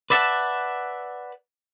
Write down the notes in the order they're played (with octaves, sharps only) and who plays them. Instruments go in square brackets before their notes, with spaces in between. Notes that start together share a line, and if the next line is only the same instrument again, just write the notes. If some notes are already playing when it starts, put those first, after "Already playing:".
[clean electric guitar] B4 D5 E5 F#5 A5